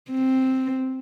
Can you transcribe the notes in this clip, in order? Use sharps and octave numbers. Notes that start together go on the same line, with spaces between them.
C4